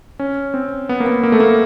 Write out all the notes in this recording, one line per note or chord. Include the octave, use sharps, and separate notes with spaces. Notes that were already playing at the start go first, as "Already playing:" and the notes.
C#4
C4
B3
A#3
B3
A#3
A3
A#3